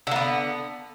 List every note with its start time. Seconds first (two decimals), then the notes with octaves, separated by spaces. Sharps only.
0.07 D3
0.11 A#3
0.16 B3